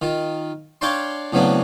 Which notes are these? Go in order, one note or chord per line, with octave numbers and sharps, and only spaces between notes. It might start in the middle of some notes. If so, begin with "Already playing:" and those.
D#3 F4
D4 C#5 F5 G5 A5 C6
A2 C#3 F#3 B3 C4 D4